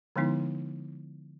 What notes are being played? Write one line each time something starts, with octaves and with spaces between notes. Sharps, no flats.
D3 F3 G#3 B3 D#4 E4